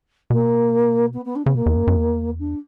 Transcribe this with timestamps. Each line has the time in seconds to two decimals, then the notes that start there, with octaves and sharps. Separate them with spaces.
0.30 B2 A#3
1.13 B3
1.25 B3
1.35 D4
1.45 C#3 B3
1.55 B2 A#3
1.66 E2
1.76 F#2
1.87 F#2
1.97 E2
2.39 D4